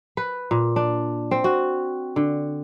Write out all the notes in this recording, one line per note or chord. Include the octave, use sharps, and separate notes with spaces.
B4
A#2
D4
C4
F#4
D3